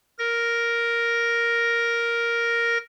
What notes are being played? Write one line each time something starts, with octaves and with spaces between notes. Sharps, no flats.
A#4 A#6